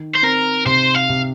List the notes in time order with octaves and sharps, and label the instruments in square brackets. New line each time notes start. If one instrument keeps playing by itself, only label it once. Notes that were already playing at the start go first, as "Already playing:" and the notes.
Already playing: [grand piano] D#3
[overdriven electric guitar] C5
[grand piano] C4 [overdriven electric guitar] A#4
[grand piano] C3 [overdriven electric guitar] C5
[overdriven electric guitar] F5
[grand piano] C3